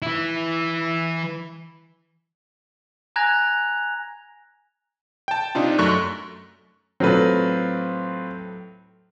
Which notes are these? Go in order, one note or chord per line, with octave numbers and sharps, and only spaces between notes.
E3 E4
G#5 A#5 F#6 G#6 A#6 F7
G5 A5
C3 D4 D#4 F4
F#2 A3 C#6 F#6
A2 F#3 C4 F4 B4